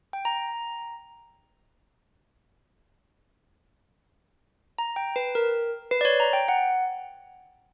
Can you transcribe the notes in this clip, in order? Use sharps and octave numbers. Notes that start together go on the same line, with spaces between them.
G5
A#5
A#5
G5
B4
A#4
B4
D5
C#5
A#5
G5
F#5